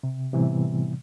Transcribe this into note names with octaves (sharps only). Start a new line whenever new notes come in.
C3
A2 C3 E3 G3 B3